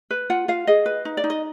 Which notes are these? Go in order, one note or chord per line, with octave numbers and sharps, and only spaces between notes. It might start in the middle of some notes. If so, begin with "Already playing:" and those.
B4
F4 F#5
F4 F5
G#4 D#5
B4
D#4
D5
D#4
D#5